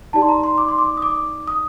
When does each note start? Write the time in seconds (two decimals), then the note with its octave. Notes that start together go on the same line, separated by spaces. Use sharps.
0.13 D#4 G4 D5 A5
0.22 C6
0.29 A#5
0.44 C6
0.58 D6
0.68 C6
0.78 D6
0.97 D#6
1.02 D6
1.48 D#6